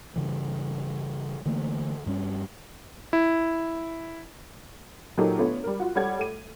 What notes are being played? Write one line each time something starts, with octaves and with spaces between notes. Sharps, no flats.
G2 C#3 E3
D3 E3 A3 A#3
G2 G3 C#4
E4
A#2 F#3 A#3 D#4 G4 A4
D3 A3 B3 F4 C#5
G3 A#4
F4 F#4
G3 A4 C#5 F#5 G#6
A3 D#7